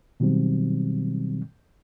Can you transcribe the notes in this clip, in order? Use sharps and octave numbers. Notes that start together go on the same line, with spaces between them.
B2 D#3 F#3 G3 C4